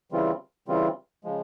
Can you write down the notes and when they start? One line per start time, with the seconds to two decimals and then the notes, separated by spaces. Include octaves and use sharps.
0.12 C#3 E3 G3 C4 F4
0.68 C#3 E3 G3 C4 F4
1.24 C#3 F3 G#3